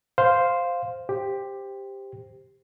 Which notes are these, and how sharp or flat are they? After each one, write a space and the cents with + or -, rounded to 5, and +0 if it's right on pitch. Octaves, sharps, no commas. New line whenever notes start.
C5 +0 F5 +0
G4 +10 C5 +0